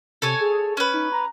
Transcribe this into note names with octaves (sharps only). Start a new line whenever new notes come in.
C3 A4 C#5 G#5
G#4
C#4 B4
D#4
A#5